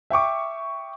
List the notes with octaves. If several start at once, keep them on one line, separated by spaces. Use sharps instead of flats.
E5 G5 C#6 D6